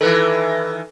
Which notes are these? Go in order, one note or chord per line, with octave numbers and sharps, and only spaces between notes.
D#3 E3 A4 B4